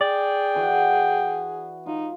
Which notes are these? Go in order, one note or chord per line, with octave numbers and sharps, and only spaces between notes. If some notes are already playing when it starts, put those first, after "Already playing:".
G#4 D5 G5
E3 F#4 F#5
D#4 F4